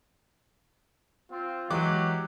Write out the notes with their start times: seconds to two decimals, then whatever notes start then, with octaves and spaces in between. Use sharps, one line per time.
1.31 C4 F4
1.70 E3 F#3 G#3 G4 D6 F#6